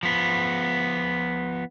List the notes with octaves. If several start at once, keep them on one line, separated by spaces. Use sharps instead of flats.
F3 B3